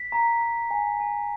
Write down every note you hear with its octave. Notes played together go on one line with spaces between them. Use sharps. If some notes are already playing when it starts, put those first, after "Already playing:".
Already playing: B6
A#5
A#5
G#5
G#5